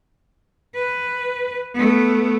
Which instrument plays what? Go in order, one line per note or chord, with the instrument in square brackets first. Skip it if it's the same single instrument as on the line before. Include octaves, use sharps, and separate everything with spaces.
[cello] B4
A3 B3